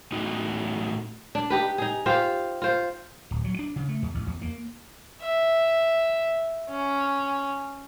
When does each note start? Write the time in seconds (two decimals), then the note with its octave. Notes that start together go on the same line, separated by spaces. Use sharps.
0.12 A2 D#4 F#4
1.35 D4
1.50 D#4 G4 B4
1.78 D#4 G#4
2.06 F4 G4 C5
2.62 F4 C5
3.31 D1
3.44 F#3
3.59 D4
3.76 C#3
3.88 A3
4.02 E2
4.15 A1
4.26 E2
4.42 A#3
5.22 E5
6.70 C#4